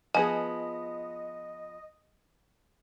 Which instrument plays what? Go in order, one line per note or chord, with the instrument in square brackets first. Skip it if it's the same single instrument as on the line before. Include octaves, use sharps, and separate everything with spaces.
[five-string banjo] F3 B3 G#4 [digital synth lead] D#5 [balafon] G#5